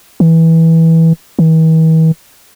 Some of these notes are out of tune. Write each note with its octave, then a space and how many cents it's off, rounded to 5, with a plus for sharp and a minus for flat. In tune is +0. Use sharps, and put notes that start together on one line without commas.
E3 -15
E3 -45